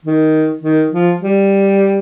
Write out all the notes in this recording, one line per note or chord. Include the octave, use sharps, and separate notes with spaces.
D#3
D#3
F3
G3